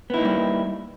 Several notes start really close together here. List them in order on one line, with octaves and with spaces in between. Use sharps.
B3 E4 D#4 A#3 G3